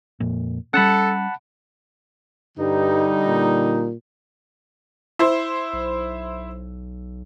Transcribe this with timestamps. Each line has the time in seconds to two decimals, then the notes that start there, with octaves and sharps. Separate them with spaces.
0.20 F2 A#2
0.74 G3 C#4 A4 F#5 A5 B5
2.58 G2 D3 G3 D#4
3.27 A#2
5.19 E4 C5
5.73 B1